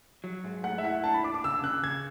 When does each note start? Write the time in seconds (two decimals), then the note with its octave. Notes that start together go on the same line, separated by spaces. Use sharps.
0.24 F#3
0.44 G#2
0.64 A3 F#5
0.78 E5
0.83 E4 F#5
1.04 D4 A5
1.14 B5
1.23 D4 D6
1.34 D6
1.44 C#3 E6
1.63 C#3 F#6
1.84 C#3 G#6